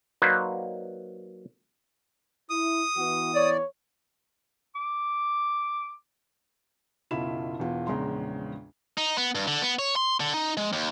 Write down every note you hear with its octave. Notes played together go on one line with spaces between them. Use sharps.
F#3 A#3 D#4 B4 C5 D5
E4 D#6
E3 B3 F#4
C#5 D5
D6
F#1 B1 E4 F4 B5 E7
E1 E2 E3 F4
A#1 E2 C#3 G#3 A#5 C6
D#4
B3
G2
D3
B3
C#5
C6
D3
D#4
G#3
D#2